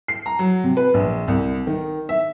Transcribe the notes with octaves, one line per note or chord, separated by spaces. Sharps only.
C7
A#5
F#3
C3
B4
A#1
C2
D#3
E5